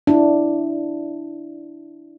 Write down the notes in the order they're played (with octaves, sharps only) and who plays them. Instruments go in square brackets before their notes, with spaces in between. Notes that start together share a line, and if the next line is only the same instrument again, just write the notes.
[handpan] D4 E4